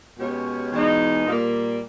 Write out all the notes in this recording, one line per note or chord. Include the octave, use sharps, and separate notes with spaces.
B2 G#3 C#4 G4 C#5
E2 B2 G#3 D#4
A#2 G3 A#3